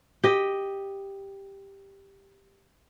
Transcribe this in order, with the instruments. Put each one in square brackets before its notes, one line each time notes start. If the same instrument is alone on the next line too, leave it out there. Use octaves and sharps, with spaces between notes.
[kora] G4 D#5